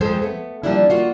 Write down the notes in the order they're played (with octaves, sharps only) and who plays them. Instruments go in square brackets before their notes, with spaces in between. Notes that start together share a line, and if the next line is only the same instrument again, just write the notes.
[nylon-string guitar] F2 F3 G#3 C4 A4 C5
A3 B3
F3 G3 A#3 D4 E4
A#3 F4 F#4